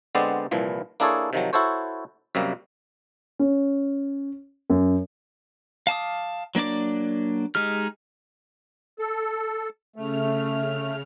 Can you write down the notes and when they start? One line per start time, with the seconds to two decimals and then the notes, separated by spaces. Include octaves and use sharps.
0.15 D3 G#3 B3 C4 C5 D5
0.51 C2 A#2 E3 F3
1.00 A#3 D4 E4 G#4 A4 C#5
1.33 C3 D#3 F3 F#3
1.53 E4 F#4 A4 C5 C#5
2.35 F#2 C3 G3 A#3
3.39 C#4
4.70 F#2
5.87 F5 A5 D6 D#6
6.55 F#3 A#3 D4 D5 D6
7.55 G#3 D#4 G4 F6
8.99 A4
9.96 C#3 A3 F6